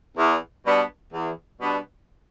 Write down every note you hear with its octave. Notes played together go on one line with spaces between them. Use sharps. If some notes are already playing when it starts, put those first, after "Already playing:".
E2
B2 G3 B3 D4
E2
B2 G3 B3 D4